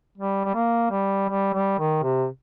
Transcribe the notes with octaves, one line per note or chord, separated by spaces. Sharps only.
G3
G3
A#3
G3
G3
G3
D#3
C3